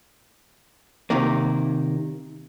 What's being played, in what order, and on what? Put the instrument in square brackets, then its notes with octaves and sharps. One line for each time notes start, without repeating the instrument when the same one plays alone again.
[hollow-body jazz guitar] C3 D#3 A#3